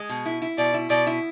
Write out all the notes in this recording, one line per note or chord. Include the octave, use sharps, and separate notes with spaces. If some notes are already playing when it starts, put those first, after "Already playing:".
Already playing: G#3
B2
E4
E4
B2 D5
E4
B2 D5
E4